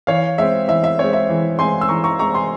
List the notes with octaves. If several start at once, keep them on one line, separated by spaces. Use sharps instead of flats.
E3 C#5 F5
G#3 C4 E5
E3 E5
E5
G#3 C4 C#5
E5
E3
G#3 C4 G#5 C6
E6
E3 A#5 C#6
A#5 C#6
G#3 C4 A#5 C#6
G#5 C6